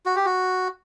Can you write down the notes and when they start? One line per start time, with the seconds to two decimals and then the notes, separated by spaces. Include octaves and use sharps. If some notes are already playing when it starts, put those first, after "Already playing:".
0.06 F#4
0.16 G4
0.25 F#4